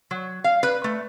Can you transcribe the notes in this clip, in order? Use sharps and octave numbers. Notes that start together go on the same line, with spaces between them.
F#3
F5
B4
A3